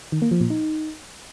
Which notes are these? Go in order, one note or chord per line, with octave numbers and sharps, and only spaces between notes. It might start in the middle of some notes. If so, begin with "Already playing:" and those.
D#3
A#3
F3
A#2
D#4